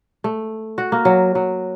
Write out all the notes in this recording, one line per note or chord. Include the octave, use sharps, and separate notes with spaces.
A3
F#4
A#3
F#3
F#3